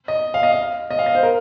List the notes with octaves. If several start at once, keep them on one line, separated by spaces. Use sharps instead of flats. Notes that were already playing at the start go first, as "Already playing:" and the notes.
D#5
F5
D#5
F5
D#5
F5
D#5
C5
A#4